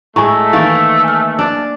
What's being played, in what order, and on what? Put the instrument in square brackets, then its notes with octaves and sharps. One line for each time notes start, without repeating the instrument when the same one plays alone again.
[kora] A2 G#3 [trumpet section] A3 [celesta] G#5 A#5 C#6
[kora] D#3 E3 A#3 [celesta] C#6 A6
[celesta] G#5 F6
[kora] D4 D5